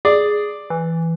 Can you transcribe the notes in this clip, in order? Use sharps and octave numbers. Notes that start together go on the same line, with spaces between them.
G#4 D5
E3